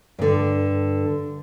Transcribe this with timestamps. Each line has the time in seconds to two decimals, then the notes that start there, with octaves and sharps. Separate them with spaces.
0.19 G2 D3